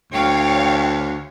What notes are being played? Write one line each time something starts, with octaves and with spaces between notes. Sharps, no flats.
D2 C#5 F5 G5